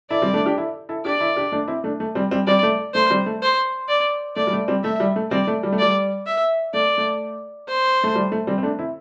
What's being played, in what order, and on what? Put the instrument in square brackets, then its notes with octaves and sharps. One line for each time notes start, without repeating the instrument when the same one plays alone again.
[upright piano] E4 A4 [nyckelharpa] D5
[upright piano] G3 C4
A3 D4
D4 G4
E4 A4
E4 A4
[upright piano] D4 G4 [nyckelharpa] D5
[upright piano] E4 A4
D4 G4
A3 D4
C4 E4
A3 D4
A3
G3 C4
G3 C4
[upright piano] G3 C4 [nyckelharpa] D5
[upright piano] A3
[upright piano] A3 [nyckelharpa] C5
[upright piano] G3 C4
A3
[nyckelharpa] C5
D5
[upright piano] A3 [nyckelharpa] D5
[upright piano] G3
A3
G3 C4
[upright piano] A3 [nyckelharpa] E5
[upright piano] G3
A3
[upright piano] G3 C4 [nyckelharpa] D5
[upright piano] A3
G3
A3
[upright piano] G3 [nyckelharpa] D5
[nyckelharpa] E5
[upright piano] A3 [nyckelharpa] D5
[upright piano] A3
[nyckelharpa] C5
[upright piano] A3
G3
A3
G3 C4
C4
A3 D4
C4 E4